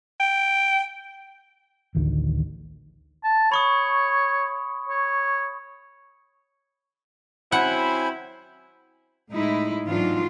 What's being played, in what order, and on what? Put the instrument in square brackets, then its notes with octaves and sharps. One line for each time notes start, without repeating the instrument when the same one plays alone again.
[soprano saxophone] G5
[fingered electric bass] A1 D2 D3 D#3
[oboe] A5
[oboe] C#5 [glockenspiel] B5 C#6 D#6
[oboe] C#5
[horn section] F#3 C4 E4 [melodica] C5 G#5 B5 [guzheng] F#5
[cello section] A2 G#3 D#4 E4
G#2 E3 F#3 D4 D#4 F4